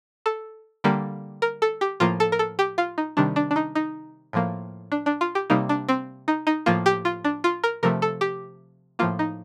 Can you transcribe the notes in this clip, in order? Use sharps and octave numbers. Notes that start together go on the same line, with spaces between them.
A4
D3 G3 A#3
A#4
A4
G4
A2 F3 A#3 F4
A4
A#4
A4
G4
F4
D#4
C3 D#3 G3 D4
D4
D4
D#4
D#4
A2 F3 A#3
D4
D4
F4
G4
C3 G3 A#3 D#4
D4
C4
D#4
D#4
A2 F3 A#3 F4
G4
F4
D4
F4
A#4
C3 F3 A3 A#4
A4
G4
A2 F3 A#3 F4
D#4